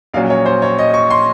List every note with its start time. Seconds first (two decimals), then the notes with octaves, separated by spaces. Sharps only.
0.14 A#1 A#2 F#3 C#4 F5
0.30 C#5
0.46 C5
0.62 C#5
0.79 D#5
0.94 C#6
1.10 C6